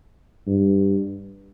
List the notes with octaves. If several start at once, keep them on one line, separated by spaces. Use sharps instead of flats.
G2